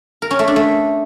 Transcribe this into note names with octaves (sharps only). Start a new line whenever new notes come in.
A#4
C#4
A3
D4
A3